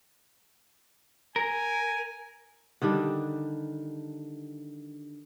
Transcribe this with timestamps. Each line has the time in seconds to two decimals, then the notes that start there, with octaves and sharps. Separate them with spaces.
1.36 A#4 G#5
2.82 D3 D#3 G3 D4